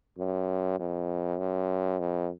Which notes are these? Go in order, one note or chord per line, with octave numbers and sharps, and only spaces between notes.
F#2
F2
F#2
F2